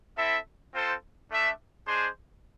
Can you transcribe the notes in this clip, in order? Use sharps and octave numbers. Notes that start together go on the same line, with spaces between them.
C4 E4 A4 E5
C4 F4 A4 C5
A3 D4 A4 E5
G#3 D4 G#4 C5